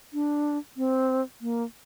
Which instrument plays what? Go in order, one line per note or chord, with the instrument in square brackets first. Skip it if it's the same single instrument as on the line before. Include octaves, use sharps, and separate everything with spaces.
[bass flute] D4
C4
A#3